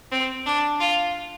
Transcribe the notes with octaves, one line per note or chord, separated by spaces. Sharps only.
C4
D4
F4